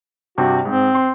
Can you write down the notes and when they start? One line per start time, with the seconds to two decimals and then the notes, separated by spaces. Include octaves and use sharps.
0.38 G2 C3 F#4 G5
0.65 G#2 C4
0.95 C6